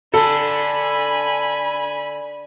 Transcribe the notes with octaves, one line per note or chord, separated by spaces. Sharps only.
D3 A4 G#5 B5